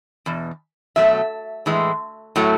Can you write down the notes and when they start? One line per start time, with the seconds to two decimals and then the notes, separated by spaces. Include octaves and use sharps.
0.26 E2 B2
0.96 B2 F#3 A3 E5
1.66 A2 E3 G#3
2.36 A2 F#3 A3